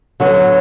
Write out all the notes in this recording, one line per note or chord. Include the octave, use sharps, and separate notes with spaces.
D3 F#3 B3